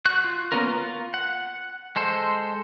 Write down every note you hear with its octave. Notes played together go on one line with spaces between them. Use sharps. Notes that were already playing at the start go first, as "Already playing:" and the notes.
F#4 F#6
F4
A#3 B3 C#4 F4 A#4
F4
F#5
G#3 A4 C5